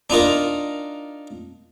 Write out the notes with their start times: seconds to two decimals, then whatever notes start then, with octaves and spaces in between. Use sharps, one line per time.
0.10 D4 D#4 F4 A#4